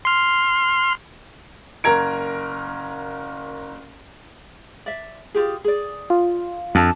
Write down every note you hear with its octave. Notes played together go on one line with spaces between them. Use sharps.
C6 F6
F#1 A#4 A#5 G#6 D7
D5 E5
F4 G4 G#4
G#4 D5
F4
F2 D4 A5